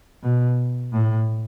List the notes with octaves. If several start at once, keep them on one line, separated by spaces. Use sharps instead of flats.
B2
A2